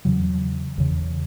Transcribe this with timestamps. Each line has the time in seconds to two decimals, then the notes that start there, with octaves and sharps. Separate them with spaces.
0.05 E2 C#3 F#3
0.78 E2 C#3